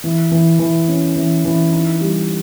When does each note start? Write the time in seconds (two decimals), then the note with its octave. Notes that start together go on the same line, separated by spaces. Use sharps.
0.04 E3
0.31 E3
0.59 E3
0.88 C#4
1.16 E3
1.45 E3
1.72 D#4
2.01 G3